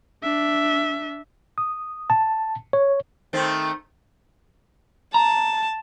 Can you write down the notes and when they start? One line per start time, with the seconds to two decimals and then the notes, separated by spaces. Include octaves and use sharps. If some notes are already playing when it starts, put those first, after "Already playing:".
0.24 D4 E5
1.58 D#6
2.10 A5
2.73 C#5
3.33 D#3 A3 C4
5.14 A5 A#5